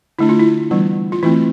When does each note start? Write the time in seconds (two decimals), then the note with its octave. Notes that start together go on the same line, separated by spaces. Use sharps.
0.19 D3 A3 D4 E4
0.29 F4
0.40 E4
0.70 E3 G3 B3 D4
1.12 F4
1.23 E3 A3 C4 E4